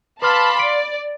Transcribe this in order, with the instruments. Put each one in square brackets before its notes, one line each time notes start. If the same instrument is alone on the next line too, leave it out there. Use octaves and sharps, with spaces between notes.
[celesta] B4 F6 [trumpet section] F5 C6 D6 [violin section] A5 B5
[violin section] D5 [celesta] D7